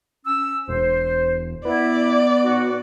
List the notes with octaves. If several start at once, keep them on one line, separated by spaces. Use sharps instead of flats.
C#4 E6
E1 C5
B3 E4 D5
A2 D#4 F#4